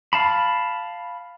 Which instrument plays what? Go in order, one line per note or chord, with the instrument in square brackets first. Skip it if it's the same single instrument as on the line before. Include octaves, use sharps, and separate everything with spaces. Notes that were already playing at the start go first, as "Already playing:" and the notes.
[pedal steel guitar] F5 A5 B5